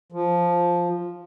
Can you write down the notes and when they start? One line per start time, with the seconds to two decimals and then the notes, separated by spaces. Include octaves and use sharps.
0.12 F3